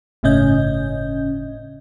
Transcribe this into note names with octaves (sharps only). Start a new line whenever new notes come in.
G1 A2 C#3 C#4 D#5 G6